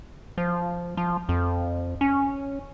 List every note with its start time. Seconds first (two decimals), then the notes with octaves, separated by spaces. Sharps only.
0.38 F3
0.97 F3
1.29 F2
2.01 C#4